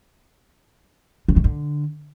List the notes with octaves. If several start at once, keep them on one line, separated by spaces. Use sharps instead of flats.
C#3
D#3
D3